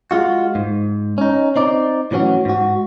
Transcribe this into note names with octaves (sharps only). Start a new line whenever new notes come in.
G#3 F4 F#4
G#2
C#4 D#4
C4 D#4 D5
A2 E3 F#3 C#4 F#4
G#2 F#4